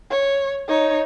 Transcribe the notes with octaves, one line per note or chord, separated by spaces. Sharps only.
C#5
D#4 C#5